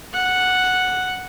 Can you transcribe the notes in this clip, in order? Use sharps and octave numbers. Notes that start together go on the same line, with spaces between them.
F#5